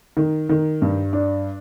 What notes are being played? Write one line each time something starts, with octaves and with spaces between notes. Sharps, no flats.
D#3
D#3
G2
D4